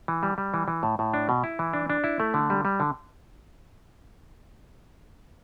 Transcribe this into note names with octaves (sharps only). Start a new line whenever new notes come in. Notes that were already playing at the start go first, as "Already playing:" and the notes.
E3
G3
G3
E3
E3
A2
A2
D4
B2
E4
E3
D4
D4
E4
A3
D3
G3
G3
D3